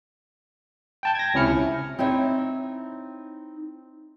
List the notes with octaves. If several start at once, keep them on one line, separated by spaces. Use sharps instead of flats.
G5 A5 G6
G#6 A#6
C#2 C3 C#4 E4 F6 C#7
C4 D#4 E4 C#5